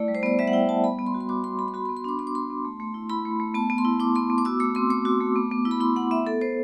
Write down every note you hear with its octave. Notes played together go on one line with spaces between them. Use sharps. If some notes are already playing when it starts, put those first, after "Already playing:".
Already playing: A3 E4 D5
G3
C5
B3 D5
G3 E5
F#5
E4 G5
G3 A5
B3 B5
B3
C6
F#4
C6
F#4 D6
B3 C6
B3 B5
C6
F#4 B5
C6
B3
C6
D4 D6
B3 C6
D6
F#4 C6
B3
A3
A3
E4
E4 B5
A3
A3
B3 A5
B3
C6
E4
E4 D6
B3 C6
B3
D6
F#4 E6
A3 D6
C4 C6
A3 D6
F#4
A3
B3
B3
E4
B5
E4 C6
B3 F#5
B3 E5
B3 A4
B3 C5